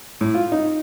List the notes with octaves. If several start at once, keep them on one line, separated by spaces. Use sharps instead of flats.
A2
F4
D#4